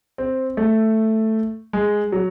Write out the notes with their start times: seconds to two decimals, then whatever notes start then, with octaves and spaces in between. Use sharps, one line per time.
0.18 C4
0.57 A3
1.73 G#3
2.12 F#3